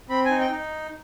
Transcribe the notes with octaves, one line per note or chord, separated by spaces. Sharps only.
C4 B5
G#5
D#4
G5
D#4